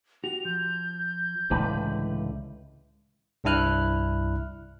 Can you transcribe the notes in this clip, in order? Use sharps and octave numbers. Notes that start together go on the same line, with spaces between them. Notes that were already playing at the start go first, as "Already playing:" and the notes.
F#4 G4 F7
F3 G6
C#2 A2 D3 E3 B4 D5
C2 G2 D4 E4 F6 F#6